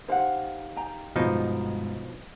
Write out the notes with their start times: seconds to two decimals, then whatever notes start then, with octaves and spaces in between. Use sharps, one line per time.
0.08 D#4 G4 C5 F5 F#5
0.77 G5 A#5
1.16 G1 G#2 B2 F3 D#4